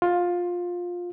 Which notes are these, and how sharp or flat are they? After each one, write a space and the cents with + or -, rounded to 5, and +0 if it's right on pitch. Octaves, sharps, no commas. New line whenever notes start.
F4 +15